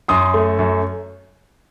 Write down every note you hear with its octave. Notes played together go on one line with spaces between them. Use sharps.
F#2 C6 D#6
A3
F#2